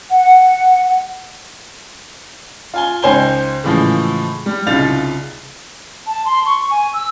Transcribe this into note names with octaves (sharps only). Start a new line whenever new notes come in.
F#5
F4 G#5 G7
C#2 D#4 C5 G5 G#5 G7
A2 C#3 E3 F3 G#3
G3
C2 C#3 D#4 F4 A6 F7
A5
C6
C#6
G#5
E6